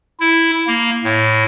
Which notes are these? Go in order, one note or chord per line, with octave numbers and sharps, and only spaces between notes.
E4
A#3
A2